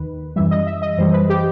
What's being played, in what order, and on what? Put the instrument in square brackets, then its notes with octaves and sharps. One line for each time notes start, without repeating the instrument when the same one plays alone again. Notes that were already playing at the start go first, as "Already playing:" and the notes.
Already playing: [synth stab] D#2 D#3 B4
F#2 E3 G3 E5
D#5
E5
D#5
F#2 E3 G3 C5
B4
G4